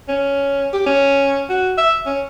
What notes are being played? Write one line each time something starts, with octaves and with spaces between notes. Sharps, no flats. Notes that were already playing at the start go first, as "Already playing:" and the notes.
C#4
G4
C#4
F#4
E5
C#4